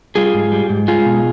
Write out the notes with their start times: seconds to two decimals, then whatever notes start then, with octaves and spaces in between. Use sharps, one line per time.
0.16 G3 F4 G#4
0.34 G#2
0.52 G3
0.69 G#2
0.88 G#3 F4 G#4
1.06 B2